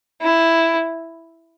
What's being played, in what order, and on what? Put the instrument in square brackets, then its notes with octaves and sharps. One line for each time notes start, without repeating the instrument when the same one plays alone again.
[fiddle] E4